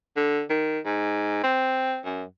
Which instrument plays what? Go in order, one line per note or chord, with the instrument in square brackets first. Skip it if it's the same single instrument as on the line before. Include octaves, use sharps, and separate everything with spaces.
[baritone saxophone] D3
D#3
G#2
C4
F#2